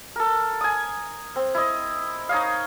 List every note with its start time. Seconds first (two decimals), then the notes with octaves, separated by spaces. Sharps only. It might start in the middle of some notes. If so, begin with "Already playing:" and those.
0.16 A4 A#4
0.61 G#5 D#6
1.36 C4
1.54 E4 D#5
2.29 D#4 C#5 D#5 F5